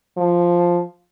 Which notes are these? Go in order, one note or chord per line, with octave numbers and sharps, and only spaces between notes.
F3